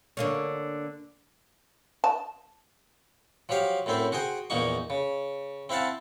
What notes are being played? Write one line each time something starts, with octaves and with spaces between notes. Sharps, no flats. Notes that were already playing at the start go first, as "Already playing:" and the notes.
D3 A#3 C#4
A5
F3 F#3 G4 F5
F#2 A2 C4 E4 C5
F#4 G#4 C5 G5
A#1 E2 A#2 A#3 D#4 C#6
C#3
C4 E4 F5 F#5 A5